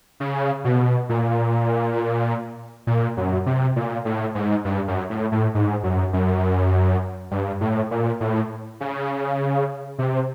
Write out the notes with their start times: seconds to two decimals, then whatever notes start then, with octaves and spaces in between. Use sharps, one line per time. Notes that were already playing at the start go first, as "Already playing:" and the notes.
0.20 C#3
0.65 B2
1.09 A#2
2.87 A#2
3.17 F#2
3.46 C3
3.76 A#2
4.05 A2
4.35 G#2
4.65 G2
4.88 F#2
5.10 A2
5.32 A2
5.55 G#2
5.83 F#2
6.13 F#2
7.31 G2
7.61 A2
7.91 A#2
8.20 A2
8.81 C#3
9.99 C3